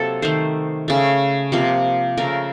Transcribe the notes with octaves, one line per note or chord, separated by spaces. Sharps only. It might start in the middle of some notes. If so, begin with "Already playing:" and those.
Already playing: C3 F#3 A#3 A4
D#3 A3 C5
C#3 A3
C3 F3 A#3
C#3 A3 A#4